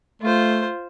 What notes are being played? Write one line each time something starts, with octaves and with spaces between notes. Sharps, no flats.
A3 F4 C5